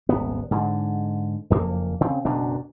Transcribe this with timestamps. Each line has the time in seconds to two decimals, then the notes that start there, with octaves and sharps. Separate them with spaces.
0.09 D#1 G#1 B3
0.51 G#2 D3
1.50 F#1 F2 A#3
2.01 C#3 C4
2.25 F#1 F#2 B2 D4